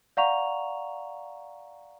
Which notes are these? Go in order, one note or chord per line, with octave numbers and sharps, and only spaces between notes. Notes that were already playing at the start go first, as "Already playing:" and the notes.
D5 F5 F#5 A#5 C#6 F7